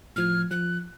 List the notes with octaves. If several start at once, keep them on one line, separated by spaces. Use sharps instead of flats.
A2 F3 F6 G#6
F3 F#6